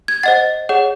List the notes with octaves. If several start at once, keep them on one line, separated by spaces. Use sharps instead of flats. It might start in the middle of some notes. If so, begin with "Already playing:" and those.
G#6
C5 D#5 F#5 A6
G#4 C#5 F#5